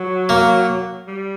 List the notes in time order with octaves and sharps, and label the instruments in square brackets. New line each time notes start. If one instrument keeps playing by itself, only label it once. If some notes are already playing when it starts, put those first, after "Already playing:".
Already playing: [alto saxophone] F#3
[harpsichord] A#3
[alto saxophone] G3